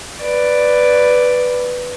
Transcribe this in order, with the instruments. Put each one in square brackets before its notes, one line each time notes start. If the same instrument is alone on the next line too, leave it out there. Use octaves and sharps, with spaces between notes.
[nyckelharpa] B4 D5